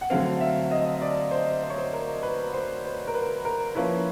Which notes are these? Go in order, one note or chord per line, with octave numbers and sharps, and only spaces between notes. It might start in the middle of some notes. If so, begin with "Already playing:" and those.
F#5
D3 F#3 A3 C4 F5
E5
D#5
D5
C5
C5
C#5
C5
A#4
B4
C5
C5
A#4
B4
A#4
F3 A#3 C#4 E4 B4